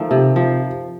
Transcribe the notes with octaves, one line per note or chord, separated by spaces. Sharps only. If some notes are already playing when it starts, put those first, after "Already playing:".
Already playing: D#3 F3 A3
C3
F3